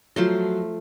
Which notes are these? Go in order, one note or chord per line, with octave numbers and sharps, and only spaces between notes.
F3 F#3 A3 C6